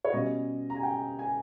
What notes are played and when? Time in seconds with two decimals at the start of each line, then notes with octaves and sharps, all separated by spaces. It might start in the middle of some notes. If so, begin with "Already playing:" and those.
0.05 C#5
0.12 B2 G3 C#4 D#5
0.70 A#5
0.76 G#5
0.83 G5
1.19 G#5